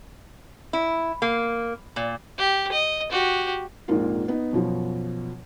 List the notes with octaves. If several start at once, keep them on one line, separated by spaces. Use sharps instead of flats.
E4
A#3
A#2
G4
D#5
F#4 G4
A#1 F2 G#2 A#3 F4
B3 D#4
F#2 B2 F3